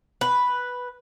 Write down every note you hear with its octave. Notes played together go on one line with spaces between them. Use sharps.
B4